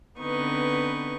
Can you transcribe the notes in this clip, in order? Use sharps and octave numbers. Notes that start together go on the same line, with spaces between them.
D3 B3 C4 D#4 B4 C#6